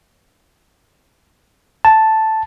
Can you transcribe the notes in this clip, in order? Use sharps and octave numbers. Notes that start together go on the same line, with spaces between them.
A5